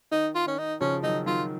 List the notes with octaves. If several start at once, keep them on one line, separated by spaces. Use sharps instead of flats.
D#3 D#4
F4
D#3 C#4
D#4
C#3 F3 C#4
D#3 F#3 D#4
D#3 F#3 F4